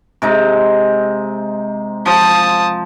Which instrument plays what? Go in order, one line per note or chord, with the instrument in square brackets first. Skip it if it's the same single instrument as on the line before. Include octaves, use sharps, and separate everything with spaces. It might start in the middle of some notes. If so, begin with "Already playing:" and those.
[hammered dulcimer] C3 G#3 D#4
[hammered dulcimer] F3 C5 [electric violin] A5 D#6